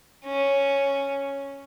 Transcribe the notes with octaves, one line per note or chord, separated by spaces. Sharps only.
C#4